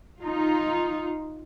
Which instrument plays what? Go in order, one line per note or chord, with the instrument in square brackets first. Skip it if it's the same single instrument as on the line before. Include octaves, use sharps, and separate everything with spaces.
[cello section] D#4 F4